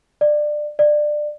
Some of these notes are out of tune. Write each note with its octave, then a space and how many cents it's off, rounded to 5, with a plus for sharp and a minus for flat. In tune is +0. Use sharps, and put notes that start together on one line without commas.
D5 +20
D5 +20